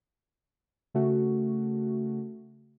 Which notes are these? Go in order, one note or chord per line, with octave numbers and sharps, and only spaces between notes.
C#3 A3 F#4